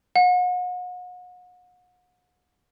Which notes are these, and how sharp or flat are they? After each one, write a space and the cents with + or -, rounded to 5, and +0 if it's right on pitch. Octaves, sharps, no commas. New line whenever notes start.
F#5 -40